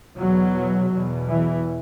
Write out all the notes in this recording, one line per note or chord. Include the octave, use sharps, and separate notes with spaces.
E2 B2 F#3
E2 B2
E3